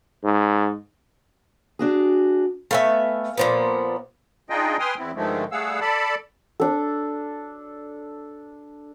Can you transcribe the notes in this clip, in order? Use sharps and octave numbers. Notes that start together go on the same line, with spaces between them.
G#2
D4 F#4 G#4
A3 B3 E5 F5 G#5
A#2 F3 B3
D4 D#4 F4 G#4 D#5 G5
B4 G5 G#5 C6 D#6 F6
E2 B3 C4 E4
G2 D3 D#3 F3 G#3 A3
G3 A3 G#4 F5 F#5 E6
A4 D5 A5 B5
D4 A4